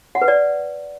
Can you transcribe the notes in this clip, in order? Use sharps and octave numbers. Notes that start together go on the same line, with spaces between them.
F#5
B4
D5